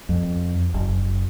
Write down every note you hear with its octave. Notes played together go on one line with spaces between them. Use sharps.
F2
F#1